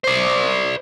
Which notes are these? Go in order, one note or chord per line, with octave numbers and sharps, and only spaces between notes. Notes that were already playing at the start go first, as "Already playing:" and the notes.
C5 D5